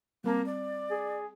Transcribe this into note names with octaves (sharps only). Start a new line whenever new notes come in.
G3 A#3 C4 A5
D5
G#4